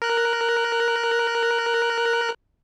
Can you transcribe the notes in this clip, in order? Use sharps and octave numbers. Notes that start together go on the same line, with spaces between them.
A#4 F#6